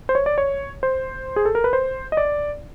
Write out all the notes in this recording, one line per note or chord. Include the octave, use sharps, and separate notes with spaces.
C5
C#5
D5
C#5
C5
G#4
A4
A#4
B4
C5
D#5
D5